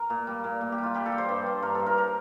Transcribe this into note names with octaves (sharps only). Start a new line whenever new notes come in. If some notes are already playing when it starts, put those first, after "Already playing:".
Already playing: A#4
A#2
G3
A#2
A#2
G4
G3
F4
G3 G4
A4
G3
C5
G2
G2
G2 A#4
G2 A4
A#4
A#4